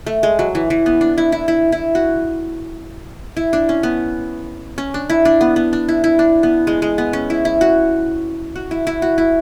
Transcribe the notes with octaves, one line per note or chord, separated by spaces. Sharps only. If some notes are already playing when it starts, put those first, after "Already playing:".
A3
G#3
F#3
E3
E3
B3
D4
E4
E4
E4
E4
F#4
E4
D4
C#4
B3
C#4
D4
E4
D4
B3
B3
D4
E4
E4
D4
B3
G#3
G#3
B3
C#4
E4
E4
F#4
F#4
E4
E4
F#4
E4